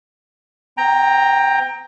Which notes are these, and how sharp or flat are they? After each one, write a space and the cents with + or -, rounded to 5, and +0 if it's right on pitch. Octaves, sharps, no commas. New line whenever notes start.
C4 -45 G5 +20 A#5 +0